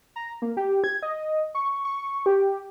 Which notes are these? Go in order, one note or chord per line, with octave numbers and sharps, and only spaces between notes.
A#5
A#3
G4
G#6
D#5
C#6
C#6
G4